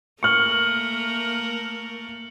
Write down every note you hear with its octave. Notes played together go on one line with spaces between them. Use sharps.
A3 A#3 A#4 C#6 F6 C#7 F#7 G7